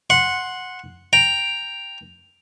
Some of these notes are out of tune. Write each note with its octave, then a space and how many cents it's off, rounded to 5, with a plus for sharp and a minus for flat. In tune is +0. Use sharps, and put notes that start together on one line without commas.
F#5 -10 C6 +10
G5 +5 A#5 +0